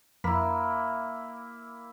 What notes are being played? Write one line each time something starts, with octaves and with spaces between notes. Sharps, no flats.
F2 A#3 E4 B5